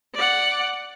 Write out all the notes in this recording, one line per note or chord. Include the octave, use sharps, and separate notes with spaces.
D5 F#5